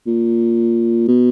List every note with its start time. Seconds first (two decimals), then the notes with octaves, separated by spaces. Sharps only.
0.07 A#2
1.08 B2